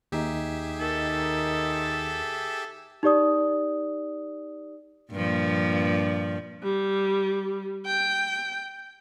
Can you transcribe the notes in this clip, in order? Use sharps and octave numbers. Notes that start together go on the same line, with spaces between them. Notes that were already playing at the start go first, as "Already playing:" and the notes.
D#2 D#4 G4 G#4 E5
D#3 A4
D#4 G4 D5 D#6
G2 A#2 F3
G3
G5